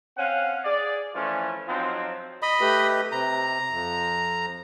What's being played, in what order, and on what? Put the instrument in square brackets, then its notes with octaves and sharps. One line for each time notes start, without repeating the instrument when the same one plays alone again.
[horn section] C4 C#4 F5 F#5
G#4 D5
E3 F3 A3 C#4 F4
F3 F#3 C4 D#4 F4
[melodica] D#5 B5
[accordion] A3 G4 B4
[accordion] C3 [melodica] A#5
[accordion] F2